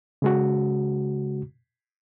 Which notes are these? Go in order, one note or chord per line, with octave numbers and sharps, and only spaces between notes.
C#3 G#3 F#4